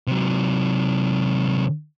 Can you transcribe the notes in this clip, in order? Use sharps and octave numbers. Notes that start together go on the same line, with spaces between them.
C3 F#3